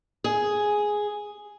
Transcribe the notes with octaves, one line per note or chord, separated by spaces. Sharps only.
G#4